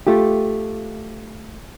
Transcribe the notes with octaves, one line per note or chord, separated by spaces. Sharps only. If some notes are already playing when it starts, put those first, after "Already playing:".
A3 F4 G4